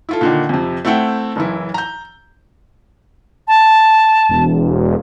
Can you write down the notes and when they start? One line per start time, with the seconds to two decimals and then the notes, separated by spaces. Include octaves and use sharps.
0.09 E4 F4 A4
0.21 A#2 D3 D#3
0.49 F2 C3
0.85 A3 C4 E4 F#5 G5
1.36 F#1 E3 E4
1.74 A#5 G6
3.48 A5
4.29 E1